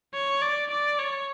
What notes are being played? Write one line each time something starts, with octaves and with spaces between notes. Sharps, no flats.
C#5
D5
D5
C#5